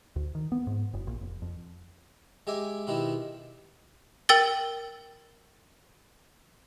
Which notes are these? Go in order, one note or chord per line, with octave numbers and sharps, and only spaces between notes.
D2
D#3
B3
G#2
F#1
A#1
F1
F2
G#3 G4 E5 G#5 D6
B2 D#3 C4 E4 G4
A#4 G5 E6 A6 G7